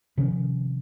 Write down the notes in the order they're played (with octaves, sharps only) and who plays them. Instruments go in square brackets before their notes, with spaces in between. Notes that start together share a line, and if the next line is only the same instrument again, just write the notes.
[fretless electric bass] C3 D#3 F3 C#4